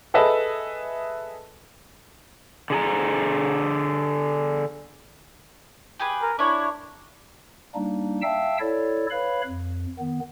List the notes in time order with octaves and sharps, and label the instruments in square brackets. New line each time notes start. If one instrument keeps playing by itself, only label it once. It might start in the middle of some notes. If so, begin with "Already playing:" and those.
[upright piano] G#4 A4 B4 D#5 E5 A5
[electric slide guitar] D3 G#4 A#5
[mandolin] G4 G#4 B4
[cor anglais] A#4
[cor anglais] D4 [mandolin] E4 C#5
[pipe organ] G3 A#3 D4 D#4
E5 F5 G5 A5 E6
E4 A4 C#5 D5
B4 C#5 F5 B5
F2
D#3 B3